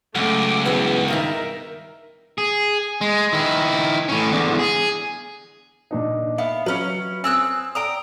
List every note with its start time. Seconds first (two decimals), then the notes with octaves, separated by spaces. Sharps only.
0.15 C#2 C#3 F#3 A3 F#5 D6
0.65 G2 E3 B3 G#4
1.08 G2 D#3 D#4 A#4 E5
2.38 G#4
3.01 G#3
3.33 D#3 E4
4.09 A2 C#4
4.31 E2 D3
4.59 G#4
5.91 A#2 D4 D#4
6.38 B3 E5 F5
6.66 F#3 C#4 B4
7.24 C4 G#5 D#6 E6 F#6
7.75 D5 G5 A#5 D#6